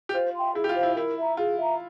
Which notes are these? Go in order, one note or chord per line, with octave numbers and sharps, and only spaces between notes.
G4
F4 C5
E5 G5 C6
E4 G#4
G4
F4
C5 F5
E4
E4 A#4
E5 A#5
F4 G#4
E5 A#5